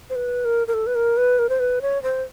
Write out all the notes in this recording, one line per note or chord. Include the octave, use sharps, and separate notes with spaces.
C5
B4
A#4
A#4
A4
B4
A#4
B4
A#4
C5
B4
C#5
C5